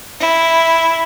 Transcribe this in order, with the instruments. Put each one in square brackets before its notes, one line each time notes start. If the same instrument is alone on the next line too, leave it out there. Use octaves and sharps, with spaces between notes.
[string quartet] E4